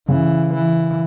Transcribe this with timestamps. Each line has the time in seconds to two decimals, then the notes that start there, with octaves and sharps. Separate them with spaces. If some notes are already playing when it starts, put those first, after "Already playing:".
0.08 C#3 E3
0.54 E3